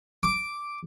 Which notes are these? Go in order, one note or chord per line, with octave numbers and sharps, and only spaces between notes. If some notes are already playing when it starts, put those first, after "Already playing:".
D6